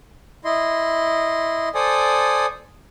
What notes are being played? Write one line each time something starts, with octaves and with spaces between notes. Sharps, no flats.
E4 D#5 C6
A4 C5 D5 G#5 D#6